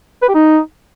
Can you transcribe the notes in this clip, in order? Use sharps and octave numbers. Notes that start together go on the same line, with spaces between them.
B4
G4
D#4